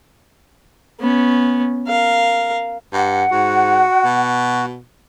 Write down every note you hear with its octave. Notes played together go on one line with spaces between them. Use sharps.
B3 C#4
A#4 F5
G2 F#5
G#2 F#4
B2